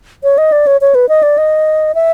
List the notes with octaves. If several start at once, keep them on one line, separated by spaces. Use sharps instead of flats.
C#5
D#5
D5
C#5
C#5
B4
D#5
D5
D#5
E5